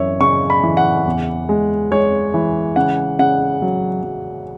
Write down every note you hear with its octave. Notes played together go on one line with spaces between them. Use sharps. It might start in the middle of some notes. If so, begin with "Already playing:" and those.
Already playing: F#2 E3 C#5 E5
C#3 C#6
B5
E3
F#5
E2
G#3
G#3 C#5
E3
C#3 F#5
C#3 F#5
F#3
F#3